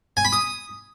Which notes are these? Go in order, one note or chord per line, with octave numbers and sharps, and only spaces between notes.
G#5
B5
D#6